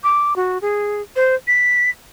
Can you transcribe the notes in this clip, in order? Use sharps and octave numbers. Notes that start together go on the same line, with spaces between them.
D6
F#4
G#4
C5
B6